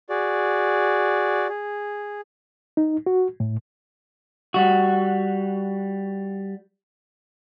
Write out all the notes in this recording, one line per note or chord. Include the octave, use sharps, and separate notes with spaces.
F#4 G#4 D5
G#4
D#4
F#4
A2
G3 F#4